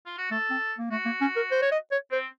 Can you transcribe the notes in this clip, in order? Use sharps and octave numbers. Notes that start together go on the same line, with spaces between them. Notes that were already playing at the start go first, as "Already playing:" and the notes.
F4
F#4
A3 A4
C4
A#3
A3 F#4
A#3
C#4
A#4
C5
C#5
D#5
C#5
C4 C5